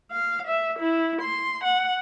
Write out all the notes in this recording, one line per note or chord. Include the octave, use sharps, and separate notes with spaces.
F5
E5
E4
C6
F#5